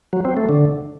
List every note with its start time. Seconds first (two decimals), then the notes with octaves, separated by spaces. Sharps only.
0.13 F#3
0.25 C4
0.37 A3
0.49 D3